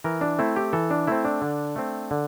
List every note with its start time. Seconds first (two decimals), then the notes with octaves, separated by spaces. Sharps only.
0.04 E3 A#4
0.21 D4
0.39 A3 C4 E4
0.56 G4
0.73 E3 A4
0.91 D4
1.07 A3 C4 E4
1.25 D4
1.42 D3
1.76 A3 C4
2.11 D3